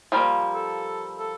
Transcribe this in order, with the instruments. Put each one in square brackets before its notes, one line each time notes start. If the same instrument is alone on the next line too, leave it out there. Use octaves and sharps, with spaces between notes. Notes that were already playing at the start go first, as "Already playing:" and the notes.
[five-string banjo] F3 G3 A#3
[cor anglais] A4
A4